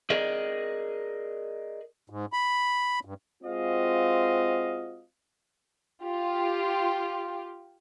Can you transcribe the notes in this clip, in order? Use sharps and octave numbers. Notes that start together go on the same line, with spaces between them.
G#4 A#4 D5 D#5
G#2
B5
G2
G#3 C4 F4 F#4 D#5 F5
F4 G4